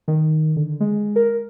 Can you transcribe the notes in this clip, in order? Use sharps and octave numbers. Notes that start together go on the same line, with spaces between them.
D#3
D3
G#3
A#4